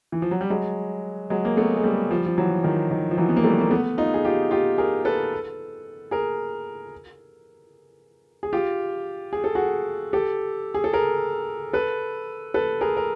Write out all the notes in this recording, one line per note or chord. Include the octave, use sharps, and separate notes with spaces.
E3
F3
F#3
G3
F#3 G#3
F#3 G#3
A#3
A3 B3
G#3
G3 A3
F3 G3
F3
E3 F#3
D#3 F3
D#3 F3
F3
E3 F#3
B3
A#3
G3 A3
A#3
A3 B3
D#4 F4
G#4
F4 G4
F4 G4
G#4 A#4
A4 B4
G#4 A#4
G#4
F4 G4
G#4
A4
F#4 G#4
G4 A4
G#4
A4
G#4 A#4
A4 B4
A4 B4
G#4 A#4
A#4